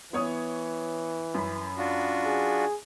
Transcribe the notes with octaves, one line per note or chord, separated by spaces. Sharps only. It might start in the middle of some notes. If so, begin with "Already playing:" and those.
E3 B3 C#5 D#6
F#2 B5
D4 F4 F#4
G#4